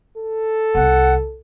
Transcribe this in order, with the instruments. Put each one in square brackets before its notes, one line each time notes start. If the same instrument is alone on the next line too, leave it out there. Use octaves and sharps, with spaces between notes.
[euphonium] A4
[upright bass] C2 B3 [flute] F#5